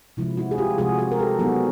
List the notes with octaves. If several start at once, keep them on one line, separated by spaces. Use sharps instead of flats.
C3 F3 G#3 E4
E4 F#4
G#4
F4 G4
C3 F3 G#3 F#4 G#4
F#4 G#4
A#4
G4 A4
F#3 B3 D#4 F#4 G#4